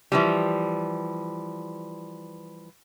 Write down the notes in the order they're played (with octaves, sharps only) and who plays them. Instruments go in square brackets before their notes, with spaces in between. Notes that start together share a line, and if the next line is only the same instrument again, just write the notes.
[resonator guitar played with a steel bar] E3 F3 G3